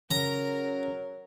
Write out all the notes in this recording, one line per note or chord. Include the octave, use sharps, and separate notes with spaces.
C#3 F#3 A#4 A#5